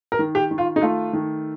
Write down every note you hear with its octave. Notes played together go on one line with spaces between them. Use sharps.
A#4
D#3
G4
D#3
F4
D#4
A3 F4
D#3